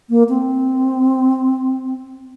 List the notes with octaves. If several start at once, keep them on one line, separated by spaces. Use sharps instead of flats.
A#3
C4